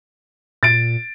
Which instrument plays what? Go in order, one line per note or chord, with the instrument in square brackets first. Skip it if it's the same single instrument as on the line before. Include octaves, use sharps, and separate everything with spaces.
[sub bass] A#2 [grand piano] A6 D7